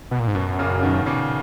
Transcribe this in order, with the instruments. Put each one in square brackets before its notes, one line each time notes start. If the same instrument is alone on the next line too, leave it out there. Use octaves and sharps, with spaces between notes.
[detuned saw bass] B2
A#2
G#2
[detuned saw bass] F#2 [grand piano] B2
[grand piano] A#2 C#3
B2 D#3
A#2 C#3